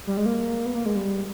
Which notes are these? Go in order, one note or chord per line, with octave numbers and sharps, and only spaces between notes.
G3
G#3
A#3
B3
A#3
G#3
G3